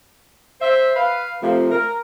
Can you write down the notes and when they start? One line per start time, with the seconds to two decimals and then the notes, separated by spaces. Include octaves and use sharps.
0.61 C5 E5
0.96 B4 F5
1.42 C3 F3 A3 F4 A#4
1.72 A#4